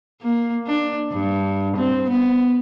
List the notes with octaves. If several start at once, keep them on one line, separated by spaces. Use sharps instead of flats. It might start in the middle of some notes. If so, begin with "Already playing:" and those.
A#3
D4
G2
C4
B3